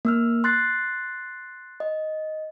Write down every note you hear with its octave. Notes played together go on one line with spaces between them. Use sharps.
A#3 E6 F6
C6 F#6 A6 C7
D#5